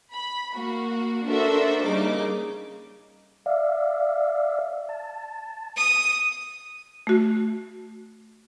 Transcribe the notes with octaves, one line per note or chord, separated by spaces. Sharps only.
B5
A#3 F#4
D4 F#4 A4 A#4 C5 E5
C#3 G3 A#3 D#4 D6
D5 E5 F5
A5
D#6
A3 F#4